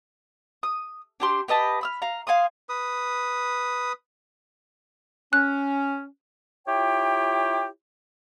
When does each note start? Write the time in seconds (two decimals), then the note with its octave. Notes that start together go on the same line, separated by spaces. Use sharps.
0.63 D#6
1.20 D4 G4 C6
1.48 G4 B4 D#5 A5
1.81 B5 E6 F6
2.02 F5 A#5
2.27 F5 G#5 C6 D#6
2.69 B4 D#6
5.33 C#4 F#6
6.67 E4 F4 G4 C#5 G5